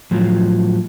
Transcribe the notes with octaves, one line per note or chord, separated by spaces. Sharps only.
A2 F3 F#3